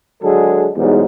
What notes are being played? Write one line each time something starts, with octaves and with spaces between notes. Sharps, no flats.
D3 F#3 G#3 G#4 A4
B1 E2 G#2 G3 G#3